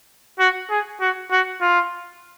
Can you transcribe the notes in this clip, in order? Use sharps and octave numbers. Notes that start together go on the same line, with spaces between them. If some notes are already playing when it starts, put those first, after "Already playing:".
F#4
G#4
F#4
F#4
F4